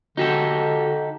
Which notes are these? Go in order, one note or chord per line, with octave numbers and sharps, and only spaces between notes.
D3 D#4 F#4 G4 A4